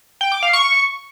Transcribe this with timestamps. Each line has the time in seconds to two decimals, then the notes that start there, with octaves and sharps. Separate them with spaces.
0.21 G5
0.32 D6
0.43 F5
0.53 C#6